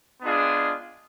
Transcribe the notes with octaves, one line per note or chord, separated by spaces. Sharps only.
G#3 B3 D4 F4 G#4